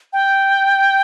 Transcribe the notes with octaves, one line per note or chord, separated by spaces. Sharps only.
G5